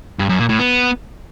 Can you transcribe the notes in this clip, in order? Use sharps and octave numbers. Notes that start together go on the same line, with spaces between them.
G2
F#2
A#2
A2
B3